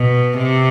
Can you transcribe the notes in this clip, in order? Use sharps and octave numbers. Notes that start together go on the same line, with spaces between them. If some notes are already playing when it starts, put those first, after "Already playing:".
Already playing: B2
C3